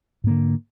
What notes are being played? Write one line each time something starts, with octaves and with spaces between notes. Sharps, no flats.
G#2 D3 A#3